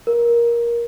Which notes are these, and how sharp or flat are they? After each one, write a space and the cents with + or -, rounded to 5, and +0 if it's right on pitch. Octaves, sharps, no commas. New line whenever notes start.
A#4 +15